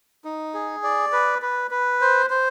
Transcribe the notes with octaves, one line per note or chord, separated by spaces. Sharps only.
D#4
G#4
D5
B4
B4
B4
C5
C5